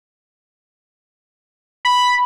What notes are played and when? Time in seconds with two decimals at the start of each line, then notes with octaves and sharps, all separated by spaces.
1.85 B5